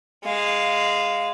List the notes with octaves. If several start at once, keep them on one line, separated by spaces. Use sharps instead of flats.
G#3 F5